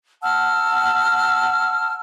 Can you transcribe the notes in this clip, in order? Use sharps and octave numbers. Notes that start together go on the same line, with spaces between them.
F#5 A5 E6 F6